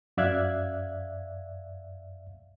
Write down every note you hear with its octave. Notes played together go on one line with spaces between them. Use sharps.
F#2 D5 E5 F5 F#6 G#6